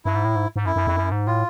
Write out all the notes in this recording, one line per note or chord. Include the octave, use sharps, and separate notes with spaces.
G2 E4
G#2
A2
G#2
G#2
F#2 E4
F#2
F2
F#2
G#2
A2 F4